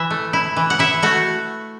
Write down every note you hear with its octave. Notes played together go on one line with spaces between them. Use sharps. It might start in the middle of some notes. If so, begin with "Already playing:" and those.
Already playing: E3 E5
A3
E4
E3
F#5
E4 E5
A3 F#4